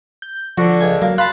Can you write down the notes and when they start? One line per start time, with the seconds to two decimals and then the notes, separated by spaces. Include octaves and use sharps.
0.22 G6
0.58 D3 F3 F#4
0.81 C#2 G#5
1.02 F#3 A#3
1.18 F4 A5 B5 C6 F#6